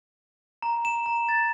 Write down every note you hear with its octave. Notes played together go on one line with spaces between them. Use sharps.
A#5
E7
A#5
A6